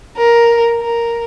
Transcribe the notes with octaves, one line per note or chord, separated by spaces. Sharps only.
A#4
A#4